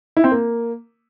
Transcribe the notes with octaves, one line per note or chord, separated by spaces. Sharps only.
E4
C4
A#3